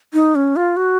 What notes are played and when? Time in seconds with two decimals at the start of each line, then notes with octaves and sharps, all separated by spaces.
0.13 D#4
0.35 C#4
0.56 F4
0.77 F#4